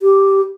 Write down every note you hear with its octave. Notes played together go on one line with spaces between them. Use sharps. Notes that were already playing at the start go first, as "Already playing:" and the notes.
G4